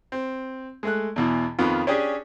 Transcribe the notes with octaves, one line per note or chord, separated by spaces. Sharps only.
C4
G#3 A3 F#6
E2 B2 E3
F2 D#3 B3 F4
C#4 D4 G4 G#4